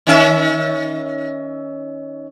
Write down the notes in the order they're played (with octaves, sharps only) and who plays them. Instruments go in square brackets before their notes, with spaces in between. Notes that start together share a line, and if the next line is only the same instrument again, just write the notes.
[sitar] D#3 C#4 E5